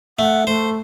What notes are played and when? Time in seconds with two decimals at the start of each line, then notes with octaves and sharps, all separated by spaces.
0.19 A3 F#5
0.47 A3 C5